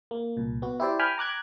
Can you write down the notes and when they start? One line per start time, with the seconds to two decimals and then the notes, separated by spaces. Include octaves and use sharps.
0.11 A#3
0.37 C2 A#2
0.62 B3 F#4
0.80 E4 G4 C5 D5
0.99 G5 G#5 B5 F6
1.18 A#5 D6 F#6 G#6